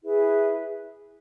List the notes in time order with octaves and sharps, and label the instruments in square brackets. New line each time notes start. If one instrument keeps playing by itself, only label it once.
[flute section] E4 G#4 B4 E5